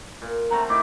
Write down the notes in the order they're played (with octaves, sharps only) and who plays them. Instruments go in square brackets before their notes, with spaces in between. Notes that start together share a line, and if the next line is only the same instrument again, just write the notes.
[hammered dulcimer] A#2
[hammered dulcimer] A3 C4 F#5 [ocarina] A#5
[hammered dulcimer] A3 D#4 E4 [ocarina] D6